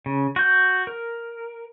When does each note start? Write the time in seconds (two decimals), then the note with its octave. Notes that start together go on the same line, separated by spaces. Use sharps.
0.06 C#3
0.36 F#4 G6
0.87 A#4